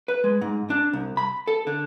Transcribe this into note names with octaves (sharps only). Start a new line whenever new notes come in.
B4
G#3
G#2
D4
C2
B5
A4
D3